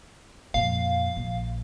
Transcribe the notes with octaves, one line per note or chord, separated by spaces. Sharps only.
F2 A#2 F5
A#1